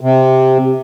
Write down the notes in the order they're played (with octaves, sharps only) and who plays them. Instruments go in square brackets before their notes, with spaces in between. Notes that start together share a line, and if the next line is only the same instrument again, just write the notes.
[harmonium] C3